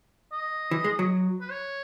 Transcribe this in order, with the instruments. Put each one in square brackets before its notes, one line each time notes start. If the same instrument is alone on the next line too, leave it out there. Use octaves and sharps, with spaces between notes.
[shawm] D#5
[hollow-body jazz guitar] E3
G#3
F#3
[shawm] B4
C#5